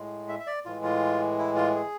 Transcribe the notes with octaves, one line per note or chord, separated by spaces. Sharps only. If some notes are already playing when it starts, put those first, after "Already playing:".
Already playing: A2 G#3
E5
E5
D5
A2 E3 G#3 F4
F4
E4
F4
G#4